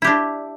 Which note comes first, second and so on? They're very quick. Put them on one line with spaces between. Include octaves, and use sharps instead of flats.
E4 G4 D4